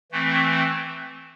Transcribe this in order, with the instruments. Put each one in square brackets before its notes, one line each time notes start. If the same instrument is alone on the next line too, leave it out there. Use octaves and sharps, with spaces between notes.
[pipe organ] E3 A3 C4